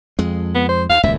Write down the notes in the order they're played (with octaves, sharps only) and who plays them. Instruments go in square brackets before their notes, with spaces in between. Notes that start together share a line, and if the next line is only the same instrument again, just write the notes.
[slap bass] F2 G#3
[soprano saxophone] B3
C5
[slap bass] D#2 [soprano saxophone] F5
[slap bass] D#1 C#2 F#2 [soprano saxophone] E5